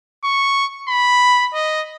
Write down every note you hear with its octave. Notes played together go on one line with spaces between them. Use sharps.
C#6
B5
D#5